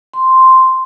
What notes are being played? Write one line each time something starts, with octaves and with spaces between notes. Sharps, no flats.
C6